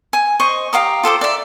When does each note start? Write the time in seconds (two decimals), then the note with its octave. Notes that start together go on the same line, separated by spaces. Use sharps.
0.13 G#5
0.40 C5 D#5 C#6
0.73 G4 F5 A#5 D#6
1.03 F4 A4 C5 D6
1.21 D5 E5